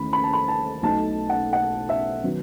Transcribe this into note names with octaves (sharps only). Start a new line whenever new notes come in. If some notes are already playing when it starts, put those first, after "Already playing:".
Already playing: D#2 E3 A3 C#4 B5
B5
A5
B5
A5
B1 B2 A3 D#4 A5
F#5
F#5
E5
D#3 F#3 B3